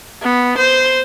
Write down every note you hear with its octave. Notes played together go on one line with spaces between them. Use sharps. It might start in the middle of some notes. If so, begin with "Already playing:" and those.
B3
C5